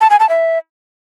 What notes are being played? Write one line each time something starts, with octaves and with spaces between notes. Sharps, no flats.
A5
G#5
A5
E5